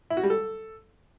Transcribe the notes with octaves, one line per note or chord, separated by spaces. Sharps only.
E4
F#4
G3
A4